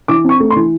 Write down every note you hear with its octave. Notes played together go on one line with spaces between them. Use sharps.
E3 D6
C4 C#6
A3
C6
E3